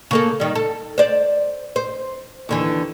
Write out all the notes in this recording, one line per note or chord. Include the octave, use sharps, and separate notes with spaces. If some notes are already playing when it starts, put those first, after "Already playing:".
C#3 A#3 A4
D#3 G3
A4
C5 D5
C5
D#2 D3 E3